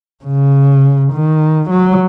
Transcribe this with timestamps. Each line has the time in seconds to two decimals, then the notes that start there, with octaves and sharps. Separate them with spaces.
0.24 C#3
1.13 D#3
1.70 F#3